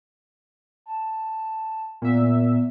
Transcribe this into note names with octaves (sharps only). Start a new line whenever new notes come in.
A5
A#2 B3 E5